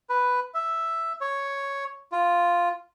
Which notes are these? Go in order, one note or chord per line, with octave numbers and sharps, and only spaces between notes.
B4
E5
C#5
F4